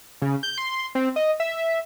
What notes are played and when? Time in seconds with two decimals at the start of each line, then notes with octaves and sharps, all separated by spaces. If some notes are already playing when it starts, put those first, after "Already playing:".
0.22 C#3
0.43 G6
0.58 C6
0.95 C4
1.16 D#5
1.40 E5